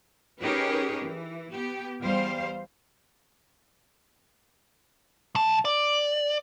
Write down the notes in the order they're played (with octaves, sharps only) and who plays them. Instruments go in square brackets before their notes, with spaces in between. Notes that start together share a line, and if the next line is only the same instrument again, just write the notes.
[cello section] C#4 D#4 G4 G#4 A#4 B4
E3
B3 G4
E2 G3 C5 F5
[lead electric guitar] B1 A5
D5